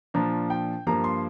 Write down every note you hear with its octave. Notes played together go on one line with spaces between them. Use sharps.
A#2 F3 D4 A#5
G5
G2 F3 A#3 A#5
C6